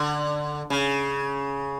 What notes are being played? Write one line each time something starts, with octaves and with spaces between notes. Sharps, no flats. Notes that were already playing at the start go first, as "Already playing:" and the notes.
Already playing: D3
C#3